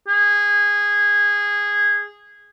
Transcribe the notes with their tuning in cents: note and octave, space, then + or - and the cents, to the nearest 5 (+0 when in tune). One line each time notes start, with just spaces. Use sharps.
G#4 -15